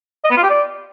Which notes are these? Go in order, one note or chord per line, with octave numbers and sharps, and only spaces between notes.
D#5
B3
F4
G4
D5